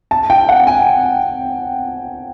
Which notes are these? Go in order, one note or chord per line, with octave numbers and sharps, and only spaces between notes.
A5
G5
F#5
G#5